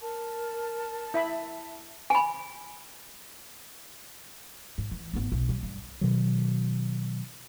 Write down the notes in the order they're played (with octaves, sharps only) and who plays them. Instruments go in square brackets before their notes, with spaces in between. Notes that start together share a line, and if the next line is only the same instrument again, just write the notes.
[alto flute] A#4 [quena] A5
[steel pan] E4 E5 B5
[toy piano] G#5 B5
[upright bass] G#2
E3
G#1 B3
B1
G3
G2
[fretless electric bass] B2 D#3 F#3